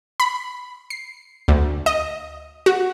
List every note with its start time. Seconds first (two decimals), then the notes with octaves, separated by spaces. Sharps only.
0.20 B5
0.90 C7
1.48 D2
1.86 D#5
2.66 F#4